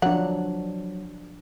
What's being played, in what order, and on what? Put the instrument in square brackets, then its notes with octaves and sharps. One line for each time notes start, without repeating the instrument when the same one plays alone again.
[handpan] F3 D4 [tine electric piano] F#3 [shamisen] F#5